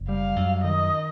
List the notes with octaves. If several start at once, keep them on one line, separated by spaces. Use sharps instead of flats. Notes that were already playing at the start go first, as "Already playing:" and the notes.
Already playing: F#1
G3 F5
F#2
D#3 D#5